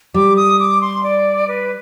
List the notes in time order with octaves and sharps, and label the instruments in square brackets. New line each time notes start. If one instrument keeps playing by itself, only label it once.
[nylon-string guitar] G3 [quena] D6
[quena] D#6
D6
C6
D5
B4